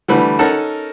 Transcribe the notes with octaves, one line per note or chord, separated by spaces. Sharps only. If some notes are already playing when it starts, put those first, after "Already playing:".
D3 E3 G3 A3 B4
C#4 D#4 A4 A#4 F#5 A5